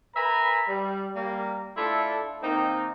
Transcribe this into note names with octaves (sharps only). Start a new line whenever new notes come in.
A#4 B4 E5 G#5 A#5 B5
G3
G3 A#3
A3 D4 E4 F4 A4
D#3 A#3 C4 D#4